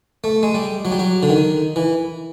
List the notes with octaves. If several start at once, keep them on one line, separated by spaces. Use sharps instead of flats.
A3
G#3
G3
F#3
G3
F#3
D3
D#3
E3